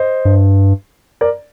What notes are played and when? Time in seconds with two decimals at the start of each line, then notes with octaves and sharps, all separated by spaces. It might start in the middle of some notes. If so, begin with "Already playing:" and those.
Already playing: C5 D#5
0.25 G2
1.21 A#4 D5